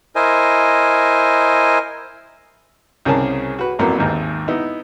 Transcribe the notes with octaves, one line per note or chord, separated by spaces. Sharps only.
E4 A#4 C5 D#5 G#5
C2 C#3 C#4 G#4 A#4 A5
F#4 B4
A1 F2 F#3 A#3 B3
G#1 D#2 G#2
B3 D#4 E4